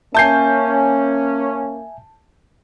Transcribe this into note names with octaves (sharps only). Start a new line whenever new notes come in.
A#3 C#4 E5 G#5 A5 G6 C7